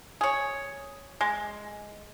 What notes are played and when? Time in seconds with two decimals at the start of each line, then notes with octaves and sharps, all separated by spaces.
0.21 G#4 C#5
1.21 G#3